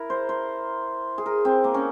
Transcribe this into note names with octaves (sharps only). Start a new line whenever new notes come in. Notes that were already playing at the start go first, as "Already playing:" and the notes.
Already playing: E4 A#4
C5
C5
G#4
A#4
C4
A#3
C#4